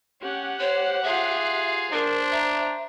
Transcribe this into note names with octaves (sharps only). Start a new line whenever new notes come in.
C#4 G4 F#5
C5 C#5
F4 G#4 E5
D4 A#4 C5
E5 A#5